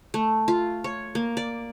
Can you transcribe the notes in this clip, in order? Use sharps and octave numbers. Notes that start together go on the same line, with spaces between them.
A3
F4
C#5
A#3
D5